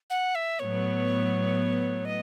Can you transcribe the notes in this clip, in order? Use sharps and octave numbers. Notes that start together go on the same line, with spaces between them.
F#5
E5
A2 F#3 B3 C#5
D#5